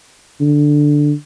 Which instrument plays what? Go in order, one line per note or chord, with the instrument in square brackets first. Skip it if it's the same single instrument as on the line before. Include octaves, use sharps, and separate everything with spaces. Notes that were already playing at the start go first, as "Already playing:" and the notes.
[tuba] D3